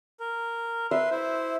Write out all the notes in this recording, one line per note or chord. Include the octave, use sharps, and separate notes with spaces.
A#4
B4 E5 C6
E4 C5